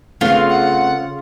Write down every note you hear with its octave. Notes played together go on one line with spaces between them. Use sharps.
C#3 A3 B3 C4 F4
F#5